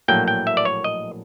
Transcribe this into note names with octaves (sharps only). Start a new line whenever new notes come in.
A#1 A2 F#3 A#3 G5
G5
E5
D5
C#5
D#5